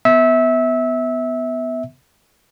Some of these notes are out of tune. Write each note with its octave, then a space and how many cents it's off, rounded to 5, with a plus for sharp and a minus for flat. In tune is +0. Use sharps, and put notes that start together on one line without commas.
B3 +10 E5 -20